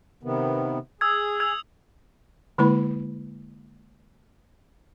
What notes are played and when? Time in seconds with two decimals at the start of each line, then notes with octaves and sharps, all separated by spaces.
0.23 C3 D#3 B3
1.01 G#4 D#6 E6 G#6
1.40 E6 G#6 F7
2.58 D3 G#3 A#3 E4 B4 B5